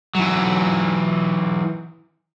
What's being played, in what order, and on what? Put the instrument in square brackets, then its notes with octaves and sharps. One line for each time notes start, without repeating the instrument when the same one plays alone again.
[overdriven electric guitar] E3 F#3